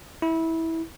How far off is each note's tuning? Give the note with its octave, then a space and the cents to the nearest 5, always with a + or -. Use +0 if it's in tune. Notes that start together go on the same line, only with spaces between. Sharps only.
E4 -20